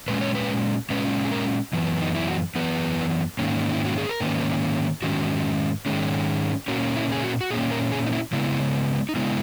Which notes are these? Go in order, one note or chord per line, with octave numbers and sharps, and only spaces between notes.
A#2 G#3 C#4 B4
C#5
B4
A#2 G#3 C#4 B4
G#4
A#4
F#2 E3 B3
D#4
E4
F#4
F#2 E3 B3 B4
G#2 D#3 A#3 C#4
E4
F#4
G#4
A#4
G#2 D#3 A#3 C#4 B4
G#2 D#3 G#3 C#4 F#4
G#2 D#3 G#3 C#4
A#2 A#3 C#4 F#4
E4
G#4
F#4
F#4
A#2 A#3 C#4 G#4
A#4
G#4
D#4
E4
C#3 G#3 B3 E4
D#4
C#3 G#3 B3 E4